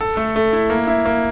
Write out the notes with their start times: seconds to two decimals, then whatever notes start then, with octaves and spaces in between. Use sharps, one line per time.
0.01 A4
0.17 A3
0.36 A3
0.53 E4
0.70 A#3
0.87 E4
1.06 A#3